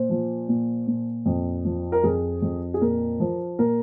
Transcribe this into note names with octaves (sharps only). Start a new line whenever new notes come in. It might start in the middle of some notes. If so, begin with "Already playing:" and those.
Already playing: A#2 C5
F3
A#2
A#2
F2
F3
A#4
F2 G#4
F2
G#4
A#2 A#4
F3
A#2 A#4